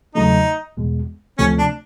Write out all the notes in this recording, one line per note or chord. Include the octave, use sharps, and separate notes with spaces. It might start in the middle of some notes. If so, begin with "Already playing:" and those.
E2 C#3 F#3 A3 D#4
E2 B2 G#3
D2 C3 F3 A3 C#4
D4